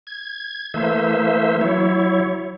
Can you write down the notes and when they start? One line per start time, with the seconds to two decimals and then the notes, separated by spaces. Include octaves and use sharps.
0.07 G#6
0.74 E3 A3 A#3 C5 E5
1.61 F#3 E4 C#5